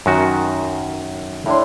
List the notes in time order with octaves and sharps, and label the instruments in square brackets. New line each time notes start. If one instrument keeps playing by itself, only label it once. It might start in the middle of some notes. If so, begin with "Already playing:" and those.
[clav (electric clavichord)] F#2 D#3 F#4
[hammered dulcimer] A2 D4 C6